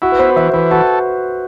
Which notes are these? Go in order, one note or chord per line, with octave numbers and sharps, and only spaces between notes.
E4 F#4
B4
B3 C5
E3 E5
E3 B4
F#4 A4